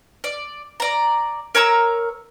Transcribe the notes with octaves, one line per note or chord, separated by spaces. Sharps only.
D5
D5 A#5
A#4 C#5 A#5 E6